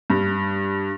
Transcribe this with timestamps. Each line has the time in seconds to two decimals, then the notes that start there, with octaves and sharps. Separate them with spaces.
0.10 G2